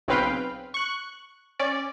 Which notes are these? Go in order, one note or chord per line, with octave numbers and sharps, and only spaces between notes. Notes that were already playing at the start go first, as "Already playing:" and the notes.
B1 C#3 C4 B4 F5 G5
C#6 F#6
C#4 D5